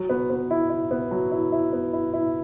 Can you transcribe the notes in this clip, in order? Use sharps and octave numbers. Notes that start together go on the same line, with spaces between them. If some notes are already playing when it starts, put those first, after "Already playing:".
Already playing: F#3
B3
B3
E4
E4
B3
F#3
E4
E4
B3
E4
E4